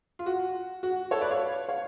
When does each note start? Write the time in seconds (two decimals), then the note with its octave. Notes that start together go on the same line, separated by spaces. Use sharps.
0.19 F4
0.26 F#4
0.83 F#4
1.11 A4 C#5
1.21 B4 D5
1.31 C#5 F5
1.69 C#5 F5